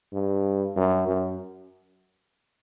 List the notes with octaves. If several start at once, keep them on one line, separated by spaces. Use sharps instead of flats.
G2
F#2
F#2